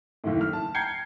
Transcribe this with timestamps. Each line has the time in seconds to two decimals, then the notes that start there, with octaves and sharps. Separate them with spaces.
0.24 F#1 D#2 A2
0.41 F6
0.53 A5
0.74 G5 A#5 G6 G#6 C7 C#7